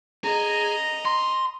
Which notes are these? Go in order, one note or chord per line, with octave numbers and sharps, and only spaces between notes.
G#4 D#5 A#5
C6